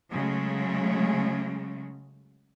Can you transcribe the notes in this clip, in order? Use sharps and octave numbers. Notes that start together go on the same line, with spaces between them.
C#3 F#3 G#3 A3